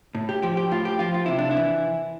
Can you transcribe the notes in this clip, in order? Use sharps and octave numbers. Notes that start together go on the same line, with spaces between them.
A2
G4
F3 G4
G4
A2 F4
G4
F3 F4
F4
C3 E4
D4
E4
E3